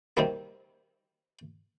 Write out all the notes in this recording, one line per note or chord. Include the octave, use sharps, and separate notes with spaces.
C3 D#3 G3 A#3